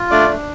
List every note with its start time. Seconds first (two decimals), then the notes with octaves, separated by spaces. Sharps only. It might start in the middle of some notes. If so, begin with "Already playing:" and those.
Already playing: F4
0.11 A3 D4 D5
0.29 D4